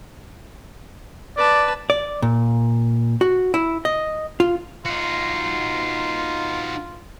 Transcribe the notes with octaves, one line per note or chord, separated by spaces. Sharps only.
B4 D5 A5
D5
A#2
F#4
E4
D#5
F4
D#4 F4 F#4